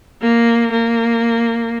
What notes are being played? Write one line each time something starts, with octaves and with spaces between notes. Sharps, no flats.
A#3
A#3